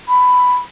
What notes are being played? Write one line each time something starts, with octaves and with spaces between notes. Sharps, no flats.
B5